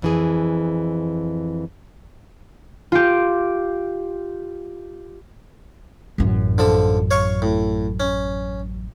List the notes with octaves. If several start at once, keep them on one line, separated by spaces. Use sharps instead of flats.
F2 E3 G#4
F4 G4
A1 F#2
D3 F3 A4
C#5 F5 C#6
A2
C#4